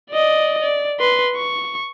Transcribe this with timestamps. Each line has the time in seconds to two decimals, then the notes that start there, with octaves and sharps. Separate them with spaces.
0.11 D5 D#5
0.61 D5
1.00 B4 C6
1.36 C#6